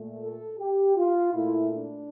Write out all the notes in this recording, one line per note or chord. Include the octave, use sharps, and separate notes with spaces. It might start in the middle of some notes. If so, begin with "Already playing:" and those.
Already playing: A#2 A3
A4
G4
F4
A#2 A3 E4
D4